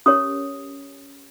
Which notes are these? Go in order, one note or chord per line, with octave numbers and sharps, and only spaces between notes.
C#4 G4 A#4 C#5 D#6